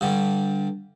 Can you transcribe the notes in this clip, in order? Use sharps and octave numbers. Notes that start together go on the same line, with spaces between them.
G2 D3 G3